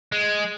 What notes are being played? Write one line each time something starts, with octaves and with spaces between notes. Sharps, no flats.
G#3